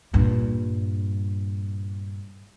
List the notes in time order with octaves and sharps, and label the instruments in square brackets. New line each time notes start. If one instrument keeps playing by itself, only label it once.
[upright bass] G2 A#2